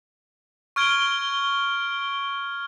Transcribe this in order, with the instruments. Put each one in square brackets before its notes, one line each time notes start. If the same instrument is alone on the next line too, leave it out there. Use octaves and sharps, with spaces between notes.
[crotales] C#6 F6 G#6 D7 G7